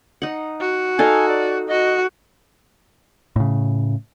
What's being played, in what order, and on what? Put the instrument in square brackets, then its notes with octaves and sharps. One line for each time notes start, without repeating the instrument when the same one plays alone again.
[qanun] D#4 F#5
[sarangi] F#4
[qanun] D#4 A4 F5 [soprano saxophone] G#5
[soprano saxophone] D5
[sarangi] F#4 [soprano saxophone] D#5
[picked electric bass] A2 C#3